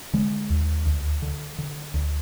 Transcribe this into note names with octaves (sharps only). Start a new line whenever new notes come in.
D3 G#3
D#2
D2
D3
D3
D2